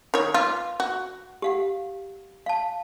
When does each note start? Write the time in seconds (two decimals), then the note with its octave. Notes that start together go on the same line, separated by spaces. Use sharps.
0.14 D#3 C#5
0.34 F4 B4 F5 D6
0.80 F#4
1.42 G4 F5 F#5
2.46 F5 A5